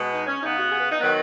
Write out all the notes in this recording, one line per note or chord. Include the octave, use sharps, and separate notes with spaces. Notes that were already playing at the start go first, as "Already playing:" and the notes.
Already playing: B2 G#3 B3
D#4
C#4
C#3 B3 D#4
F#4
G#4
B4
D#4
D#3 F#3 B3 B4